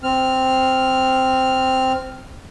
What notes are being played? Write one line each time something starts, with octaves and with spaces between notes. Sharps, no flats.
C4 F6